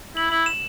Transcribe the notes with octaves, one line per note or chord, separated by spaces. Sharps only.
E4 F#7
E4 F#7
E7